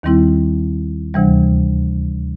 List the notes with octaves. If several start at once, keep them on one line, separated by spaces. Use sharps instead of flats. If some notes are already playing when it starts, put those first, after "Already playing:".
D#2 D#3 G3 C4 E4
D2 C3 E3 G3